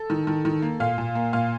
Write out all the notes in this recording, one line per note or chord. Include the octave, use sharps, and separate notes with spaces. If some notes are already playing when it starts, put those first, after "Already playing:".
Already playing: A4
D#3
D#3
D#3
A#3
A#2 F5
A#2
A#3
A#2 F5